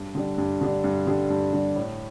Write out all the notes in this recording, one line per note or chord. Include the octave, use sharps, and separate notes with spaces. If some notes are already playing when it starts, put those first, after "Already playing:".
Already playing: G2
D3 G3 D4
G2
D3 G3 D4
G2
D3 G3 D4
G2
D3 G3 D4
A2